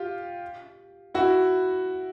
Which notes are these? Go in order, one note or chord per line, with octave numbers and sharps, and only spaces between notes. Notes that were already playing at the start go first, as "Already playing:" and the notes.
Already playing: F4 G4
E4 F#4